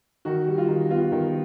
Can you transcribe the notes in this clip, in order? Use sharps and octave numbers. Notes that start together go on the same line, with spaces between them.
D#3 F#4
G3
F4
D#3
B3 F4
D#3